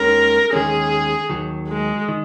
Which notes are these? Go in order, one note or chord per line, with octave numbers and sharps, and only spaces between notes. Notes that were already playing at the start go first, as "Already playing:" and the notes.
Already playing: D#2 D#3 G#3 C#4 A#4
D#2 D#3 G#3 C#4 G#4
D#2 D#3 F#3
G#3
D#3